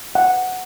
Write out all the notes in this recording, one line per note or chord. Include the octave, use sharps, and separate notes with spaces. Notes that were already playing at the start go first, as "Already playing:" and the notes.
F#5